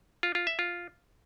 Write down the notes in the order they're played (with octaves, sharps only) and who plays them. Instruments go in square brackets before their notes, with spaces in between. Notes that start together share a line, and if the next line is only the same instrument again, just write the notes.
[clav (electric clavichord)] F4
F4
E5
F4